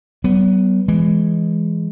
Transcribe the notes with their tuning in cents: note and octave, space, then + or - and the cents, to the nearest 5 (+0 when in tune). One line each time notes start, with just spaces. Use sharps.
F#3 +45 B3 +0
E3 +15 G#3 +0